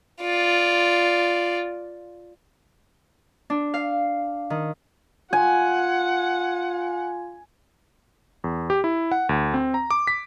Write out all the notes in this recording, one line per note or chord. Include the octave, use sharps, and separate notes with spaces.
F4 D5
D4
F5
D#3
F4 F#5 G#5
E2
G4
E4
F#5
D2
C4
A#5
D6
B6